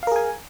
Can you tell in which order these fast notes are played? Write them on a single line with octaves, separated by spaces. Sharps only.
F5 A#4 G#4 G#5